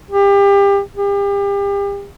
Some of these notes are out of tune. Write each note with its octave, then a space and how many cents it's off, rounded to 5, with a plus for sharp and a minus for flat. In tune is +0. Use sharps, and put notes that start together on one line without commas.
G4 +30
G4 +35